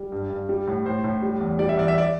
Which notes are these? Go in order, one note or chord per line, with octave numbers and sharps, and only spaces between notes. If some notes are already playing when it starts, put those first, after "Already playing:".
Already playing: G3
G2
G2
G3
A2
A2 C5
A2
G3
E2
G3 D5
E5
E2 D5
E5
D5